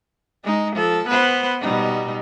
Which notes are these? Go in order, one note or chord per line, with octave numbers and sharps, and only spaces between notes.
G#3 D#4
F3 A4
B3 B4 C5
B2 G3 D#4